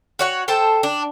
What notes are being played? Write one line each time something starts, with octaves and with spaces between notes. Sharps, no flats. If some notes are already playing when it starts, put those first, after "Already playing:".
F#4 C#5 F#5
A4 C5 G5 A5
D4